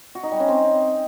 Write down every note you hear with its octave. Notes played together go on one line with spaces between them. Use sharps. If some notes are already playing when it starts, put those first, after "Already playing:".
F#4
D#4
G3
C#4
C4